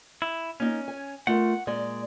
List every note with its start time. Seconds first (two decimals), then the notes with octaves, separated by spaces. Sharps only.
0.22 E4
0.60 A#3 C#4 D#4
0.88 G#5
1.27 A3 F4 A#4 F#5
1.67 A#2 G#3 D5